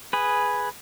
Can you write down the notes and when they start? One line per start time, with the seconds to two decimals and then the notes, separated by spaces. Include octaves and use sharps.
0.13 G#4 B4